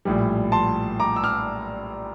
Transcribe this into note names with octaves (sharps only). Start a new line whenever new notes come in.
A#1 A2 G3
A5 C6
A#5 D6
E6
D6 F6